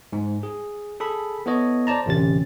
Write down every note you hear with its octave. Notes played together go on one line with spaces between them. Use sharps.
G#2
G#4
G#4 A4 B5
B3 E4 A4 C#5 D#5
C5 D5 A5 A#5
A1 D2 C3 C#4 G4 A6